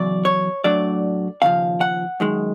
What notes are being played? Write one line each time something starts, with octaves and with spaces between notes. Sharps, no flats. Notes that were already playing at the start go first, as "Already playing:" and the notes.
Already playing: E2 C#3 F#3 D5
C#5
A2 F#3 A3 D4 D5
D#2 C#3 F3 F5
F#5
F#2 D#3 G#3